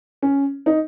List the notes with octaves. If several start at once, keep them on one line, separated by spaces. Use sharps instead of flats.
C#4
D#4